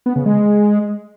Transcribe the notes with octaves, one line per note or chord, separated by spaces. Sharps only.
B3
C#3
G#3